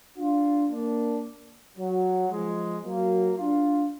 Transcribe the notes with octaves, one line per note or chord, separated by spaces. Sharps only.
D4 F4
A#3 D4
F#3
F3 G#3
F#3 A#3
D4 F4